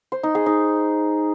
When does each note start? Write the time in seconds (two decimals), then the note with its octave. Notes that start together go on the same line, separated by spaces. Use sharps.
0.12 C5
0.23 D#4
0.35 G#4
0.46 D#4